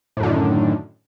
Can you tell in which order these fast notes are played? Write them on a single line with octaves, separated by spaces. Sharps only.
A2 F#2 D3 D#3